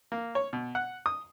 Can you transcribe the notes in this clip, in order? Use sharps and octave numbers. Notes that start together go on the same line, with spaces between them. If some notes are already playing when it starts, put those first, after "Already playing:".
A#3
C#5
B2
F#5
D#6